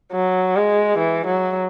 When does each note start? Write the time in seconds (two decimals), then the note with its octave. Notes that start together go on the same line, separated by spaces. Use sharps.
0.12 F#3
0.56 G#3
0.99 E3
1.27 F#3